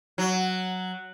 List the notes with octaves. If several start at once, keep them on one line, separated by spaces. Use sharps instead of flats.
F#3